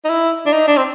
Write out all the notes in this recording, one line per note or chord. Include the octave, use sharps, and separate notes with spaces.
D#4
E4
D4
D#4
D4
C4